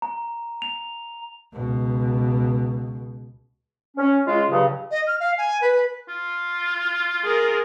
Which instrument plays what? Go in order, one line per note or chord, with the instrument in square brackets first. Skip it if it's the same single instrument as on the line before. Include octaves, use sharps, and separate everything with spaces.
[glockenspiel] A#5
F7
[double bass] C#2 B2
[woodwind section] C#4
C#3 G#3 F4
G2 C#3 F#3
[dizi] D#5
F6
F5
G#5
B4
[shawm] F4
[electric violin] G#4 A#4